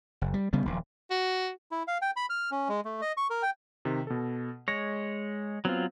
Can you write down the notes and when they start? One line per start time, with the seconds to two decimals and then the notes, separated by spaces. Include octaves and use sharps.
0.21 F#1
0.34 G3
0.53 C#3 G3 B3
0.66 D#1 A#1
1.10 F#4
1.71 E4
1.88 F5
2.02 G5
2.16 B5
2.30 F6
2.51 C#4
2.69 G#3
2.85 A3
3.02 D#5
3.17 C#6
3.30 A#4
3.42 G5
3.85 C3 D#3
4.07 B2 A4
4.68 G#3 C#5 A#6
5.65 F#3 B3 C4 F4